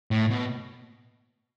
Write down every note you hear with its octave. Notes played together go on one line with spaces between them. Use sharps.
A2
B2